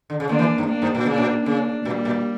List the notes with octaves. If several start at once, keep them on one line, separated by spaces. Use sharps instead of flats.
D3
C#3
D3 A#3 D4
E3
G2
A#3 D4
G2
A#2
C#3 A#3 D4
A#2
C#3 A#3 D4
A#2 G3 A#3
A#2